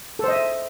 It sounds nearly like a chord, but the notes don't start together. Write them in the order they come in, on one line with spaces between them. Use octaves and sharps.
A4 C5 D#5 E5